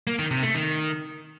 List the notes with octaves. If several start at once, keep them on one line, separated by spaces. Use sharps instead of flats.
A#3
D#3
C3
A3
D#3